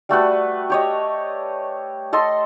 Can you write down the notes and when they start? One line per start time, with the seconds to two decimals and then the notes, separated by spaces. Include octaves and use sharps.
0.09 G3 A3 F#4 B4
0.70 G4 C#5 D#5
2.13 A4 D#5 C6